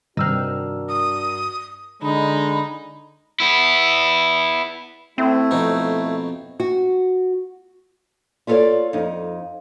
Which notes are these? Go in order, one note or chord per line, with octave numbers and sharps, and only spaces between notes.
G2 C3 D#3 D4 F#4 A#4 E6 F6
D#6
D3 G#3 D#4 B5
B3 E4
A3 C4 E4
F2 B2 D#4
F#4
E4 F4 A4 A#4 C#5 D5
F2 D#4